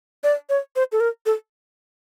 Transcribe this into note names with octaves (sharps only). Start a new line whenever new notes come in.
D5
C#5
C5
A4
A#4
A4